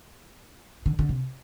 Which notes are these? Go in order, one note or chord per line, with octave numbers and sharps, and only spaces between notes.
D3
D3
C3